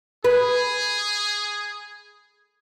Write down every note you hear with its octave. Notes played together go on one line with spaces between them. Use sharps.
G#4 B4